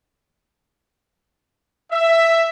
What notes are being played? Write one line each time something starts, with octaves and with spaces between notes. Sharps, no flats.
E5